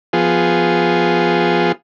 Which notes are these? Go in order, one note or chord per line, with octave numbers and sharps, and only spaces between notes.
F3 B3 F4 G#4